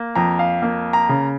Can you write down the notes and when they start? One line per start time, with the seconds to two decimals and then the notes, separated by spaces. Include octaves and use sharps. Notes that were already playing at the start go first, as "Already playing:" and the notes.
Already playing: A#3
0.15 F2 A#5
0.39 F5
0.62 A#3
0.93 A#5
1.09 C#3